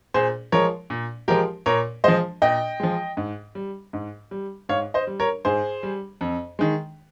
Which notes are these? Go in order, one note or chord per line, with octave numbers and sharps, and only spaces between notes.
A#2 G#4 C5
F3 G#3 A#4 C#5
A#2
F3 G#3 G4 A#4
A#2 A#4 C#5
F3 G#3 C5 D#5
A#2 D#5 G5
F3 G#3
G#2
G3
G#2
G3
G#2 C#5 F5
C5 D#5
G3
A#4 C#5
G#2 G#4 C5
G3
F2
D#3 G#3